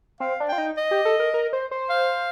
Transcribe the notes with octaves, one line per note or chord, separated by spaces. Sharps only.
C4 F5
D4
F4 G5
D#4
D#5
G4
A4
A#4
A#4
C5
C5
F5